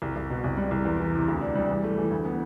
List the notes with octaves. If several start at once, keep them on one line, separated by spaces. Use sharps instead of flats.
C2
C2
B2
C2
G3
C2
E2
E3
C3
D2
D4
G3
E3
A3
E3
D2
B3